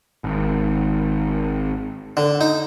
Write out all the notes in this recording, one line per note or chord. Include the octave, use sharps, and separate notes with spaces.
G#1
D3
D#4